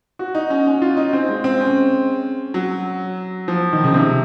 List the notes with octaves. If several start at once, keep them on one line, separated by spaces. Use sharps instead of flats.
F#4
D#4
C#4
C#4
F4
D#4
C4
G#3
C4
C#4
F#3
F3
D#3
C#3
C3